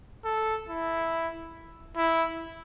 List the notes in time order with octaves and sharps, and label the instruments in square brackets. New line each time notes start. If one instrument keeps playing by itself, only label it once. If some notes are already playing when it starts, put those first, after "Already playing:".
[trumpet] A4
E4
E4